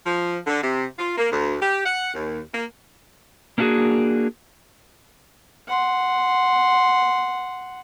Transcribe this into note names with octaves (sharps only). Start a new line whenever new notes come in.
F3
D3
C3
F4
A#3
D2
G4
F#5
D#2
A#3
A#3 C#4 D4 E4 F#4 G#4
F#5 C6